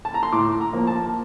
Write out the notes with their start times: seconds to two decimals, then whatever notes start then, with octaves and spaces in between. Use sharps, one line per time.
0.05 A5
0.14 A#5
0.23 C6
0.32 A2 D6
0.60 A#5
0.73 F3 A#3
0.87 A5